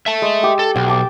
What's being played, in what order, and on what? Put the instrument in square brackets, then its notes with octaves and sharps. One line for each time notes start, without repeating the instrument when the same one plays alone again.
[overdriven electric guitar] E5 A5
[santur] G#3
G4
[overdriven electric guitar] A4
[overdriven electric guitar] B1 [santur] G5
[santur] A5 D6